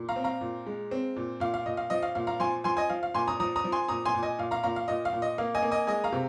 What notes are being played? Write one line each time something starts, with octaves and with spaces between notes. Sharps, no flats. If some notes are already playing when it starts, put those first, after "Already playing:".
Already playing: A#2
F5 A#5
C4
F5 A#5
A#2
G#3
C4
A#2
A#2 F5
F5
A#2 D#5
F5
F3 D#5
F5
A#2 F5
F5 A#5
F3 G#5 C6
F3 G#5 C6
D#5 G#5
F3 F5
F5
A#2 G#5 C6
A#5 D#6
F3 A#5 D#6
A#5 D#6
F3
G#5 C6
A#2 A#5 D#6
G#5 C6
A#2
D#5 G#5
A#2 F5
F5 A#5
A#2 F5 A#5
F5
A#2 D#5
F5
A#2
D#5
A#3 F5
D#5 G#5
A#3
D#5 G#5
G#3 D#5 G#5
F5 A#5
C3